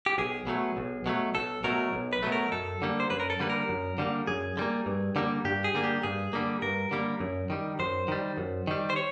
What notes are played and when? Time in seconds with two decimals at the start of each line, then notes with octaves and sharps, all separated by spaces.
0.06 G4
0.18 B1 G#4
0.47 B2 F#3 A3
0.77 B1
1.06 B2 F#3 A3
1.35 B1 A4
1.64 B2 F#3 A3 A#4
1.93 B1
2.13 B4
2.23 B2 F#3 A3
2.32 A#4
2.52 F#2 A4
2.82 D3 G3 A#3
3.00 C5
3.10 F#2 B4
3.20 A#4
3.30 A4
3.40 D3 G3 A#3 B4
3.50 A#4
3.69 F#2
3.98 D3 G3 A#3
4.27 F#2 G#4
4.57 D3 G3 A#3
4.86 G2
5.16 D3 G3 A#3
5.45 G2 G4
5.64 G#4
5.74 D3 G3 A#3
5.84 G4
6.03 G2 G#4
6.33 D3 G3 A#3
6.62 G2 A#4
6.91 D3 G3 A#3
7.20 F#2
7.50 D#3 G3
7.79 F#2 C5
8.08 D#3 G3
8.38 F#2
8.67 D#3 G3
8.90 C5
8.96 C#5